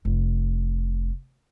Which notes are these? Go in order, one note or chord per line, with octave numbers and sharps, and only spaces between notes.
F1